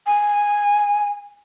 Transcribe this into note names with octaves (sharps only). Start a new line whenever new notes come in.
G#5